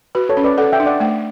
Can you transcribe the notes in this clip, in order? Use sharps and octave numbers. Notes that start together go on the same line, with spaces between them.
F#4 B4
A4 C#5
C#4
B4 D5
A4 D5 F#5
E5 G5
D4
D5 F#5
A3